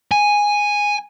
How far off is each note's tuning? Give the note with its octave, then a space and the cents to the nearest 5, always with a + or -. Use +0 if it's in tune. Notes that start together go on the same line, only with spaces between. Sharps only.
G#5 -5